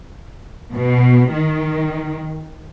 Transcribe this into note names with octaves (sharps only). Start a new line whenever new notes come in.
B2
D#3